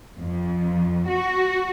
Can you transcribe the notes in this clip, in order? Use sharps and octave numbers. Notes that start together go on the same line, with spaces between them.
F2
F#4